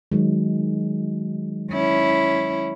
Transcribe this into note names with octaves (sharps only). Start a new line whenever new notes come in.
D#3 F#3 G#3
C#4 E4